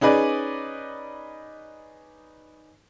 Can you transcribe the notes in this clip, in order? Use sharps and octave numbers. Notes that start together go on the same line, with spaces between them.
C#4 D#4 G#4 B4 D5